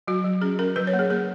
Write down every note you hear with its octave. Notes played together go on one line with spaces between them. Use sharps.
F#3 F#4
F#3
C#4 G#4
C#4 A#4
F#3 B4
C#5
A#3
G#4
A#3 G#4